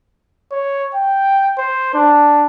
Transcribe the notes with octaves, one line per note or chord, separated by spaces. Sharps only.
C#5
G5
C5
D4